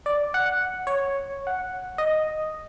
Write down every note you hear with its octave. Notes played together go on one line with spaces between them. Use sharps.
D5
F#5
C#5
F#5
D#5